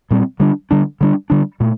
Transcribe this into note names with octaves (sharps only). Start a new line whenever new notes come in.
A#2 G3 C4
D3 G3 D4
D3 G3 D4
D3 G3 D4
D3 G3 D4
A#2 A3